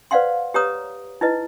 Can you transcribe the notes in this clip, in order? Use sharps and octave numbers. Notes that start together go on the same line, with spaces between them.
B4 C5 D5 F5 F#5 C6
G4 B4 C#5 A#5 D#6
D#4 E4 B4 D#5